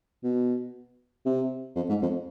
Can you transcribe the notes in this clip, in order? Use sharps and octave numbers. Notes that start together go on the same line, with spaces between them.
B2
C3
F2
G#2
F2